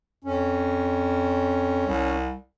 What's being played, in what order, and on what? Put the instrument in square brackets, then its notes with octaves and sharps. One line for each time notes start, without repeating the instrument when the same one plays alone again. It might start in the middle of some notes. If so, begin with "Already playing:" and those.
[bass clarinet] F2 [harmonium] C#4
[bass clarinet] C2